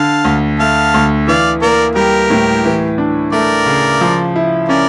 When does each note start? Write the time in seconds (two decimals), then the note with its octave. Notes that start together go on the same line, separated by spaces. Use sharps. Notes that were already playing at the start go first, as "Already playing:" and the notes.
Already playing: D3 F5 A5
0.25 D2
0.59 A3 F5 A5
0.94 D2
1.27 E3 D5 F5
1.62 A#3 A#4 D5
1.95 G3 G4 A#4
2.30 A2
2.65 E3
2.98 D4
3.32 A3 A#4 D5
3.66 C#3
4.01 F3
4.36 E4
4.69 C#4 A#4 D5